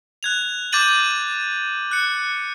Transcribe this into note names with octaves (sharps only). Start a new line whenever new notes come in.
F#6 G#6 F7
D6 G6 A6 D#7 F#7
F#6 C#7